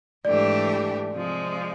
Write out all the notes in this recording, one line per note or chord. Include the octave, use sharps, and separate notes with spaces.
G#2 E3 A3 D4 G4 D5
C3 F3 G#3